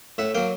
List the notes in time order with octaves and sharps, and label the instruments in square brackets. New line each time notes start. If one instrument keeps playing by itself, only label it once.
[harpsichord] A2 E5 F#5
F#3 A#3 F5 G5